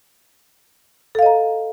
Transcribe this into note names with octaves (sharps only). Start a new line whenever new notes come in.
A4 D#5 F5 A#5